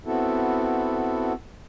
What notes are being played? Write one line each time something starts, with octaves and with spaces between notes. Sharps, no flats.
B3 C4 E4 F#4 A4